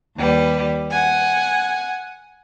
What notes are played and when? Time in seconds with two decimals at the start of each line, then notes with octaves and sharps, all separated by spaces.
0.16 D#2 G3 B4
0.90 F#5 G#5